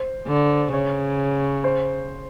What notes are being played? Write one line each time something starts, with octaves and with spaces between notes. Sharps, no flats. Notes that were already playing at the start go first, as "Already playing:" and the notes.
Already playing: C5
D3
C#3 C#5
C5